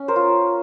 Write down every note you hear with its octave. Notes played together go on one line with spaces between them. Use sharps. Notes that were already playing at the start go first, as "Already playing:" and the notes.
Already playing: C#4
A#4 C5
F4